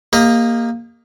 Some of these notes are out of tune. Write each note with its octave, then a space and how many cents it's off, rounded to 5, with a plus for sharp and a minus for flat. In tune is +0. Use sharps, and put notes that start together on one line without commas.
A#3 +0 G4 +45 D#5 +0